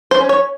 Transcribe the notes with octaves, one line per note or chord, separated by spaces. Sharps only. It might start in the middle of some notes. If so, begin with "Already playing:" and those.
C5
C#4
C#5